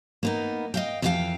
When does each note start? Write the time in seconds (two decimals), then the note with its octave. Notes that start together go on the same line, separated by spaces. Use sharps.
0.23 A#3 B3 D#4
0.74 D#5 F5 G5
1.02 F2 E3 C#4 G4 F5 G5